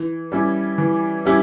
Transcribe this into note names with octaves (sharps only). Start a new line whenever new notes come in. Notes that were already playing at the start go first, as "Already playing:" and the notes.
Already playing: E3
G3 C#4 E4 G4
E3
G3 C#4 E4 G4